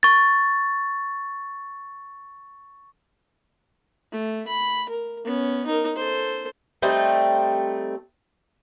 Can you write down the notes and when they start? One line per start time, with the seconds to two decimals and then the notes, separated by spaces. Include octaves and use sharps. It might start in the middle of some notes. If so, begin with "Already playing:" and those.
0.03 C#6 A6
4.12 A3
4.47 B5
4.89 A#4
5.25 B3 C#4
5.66 D#4 A#4
5.96 A4 C5
6.82 G3 A3 C4 D#4